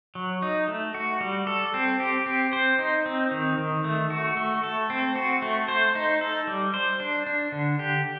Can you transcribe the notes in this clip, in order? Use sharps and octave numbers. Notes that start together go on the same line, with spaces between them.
F#3
D#4
A3
F#4
G3
A4
C4
G4
C4
C5
D#4
C4
D#3
D#3
A3
F#4
A3
A4
C4
F#4
A3
C5
D#4
A4
G3
C5
D4
D4
D3
G4